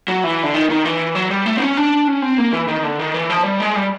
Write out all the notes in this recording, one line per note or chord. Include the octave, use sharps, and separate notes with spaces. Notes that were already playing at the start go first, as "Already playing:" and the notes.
F#3
E3
D3
D#3
D#3
E3
F#3
G3
A3
C4
C#4
D4
C#4
C4
A#3
E3
D#3
D3
D#3
E3
F3
G3
G#3
G3